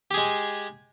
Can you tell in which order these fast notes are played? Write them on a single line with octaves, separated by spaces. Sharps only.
G4 G#4 G#3